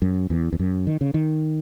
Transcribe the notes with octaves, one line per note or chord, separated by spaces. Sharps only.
F#2
E2
E2
F#2
D#3
C#3
D#3